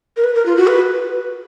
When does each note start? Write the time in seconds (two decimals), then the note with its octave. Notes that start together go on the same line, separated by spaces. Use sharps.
0.17 A#4
0.24 B4
0.35 A#4
0.46 F4
0.57 F#4
0.67 B4